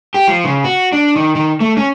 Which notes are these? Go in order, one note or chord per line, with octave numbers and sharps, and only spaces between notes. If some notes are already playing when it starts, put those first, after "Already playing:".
G4
F3
C#3
F#4
D4
D#3
D#3
A3
C#4